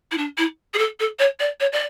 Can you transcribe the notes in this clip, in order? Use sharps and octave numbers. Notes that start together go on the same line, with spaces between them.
E4
D4
E4
G#4
A4
A4
C#5
D5
C#5
D5